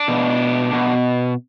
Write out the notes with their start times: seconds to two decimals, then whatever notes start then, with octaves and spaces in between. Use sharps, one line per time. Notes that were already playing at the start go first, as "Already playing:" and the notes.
Already playing: D4
0.08 B2
0.73 B2